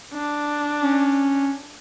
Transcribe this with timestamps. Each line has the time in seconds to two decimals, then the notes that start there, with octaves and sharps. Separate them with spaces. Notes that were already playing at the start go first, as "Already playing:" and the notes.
0.14 D4
0.82 C#4